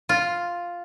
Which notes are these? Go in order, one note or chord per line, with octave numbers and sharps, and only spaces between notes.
F4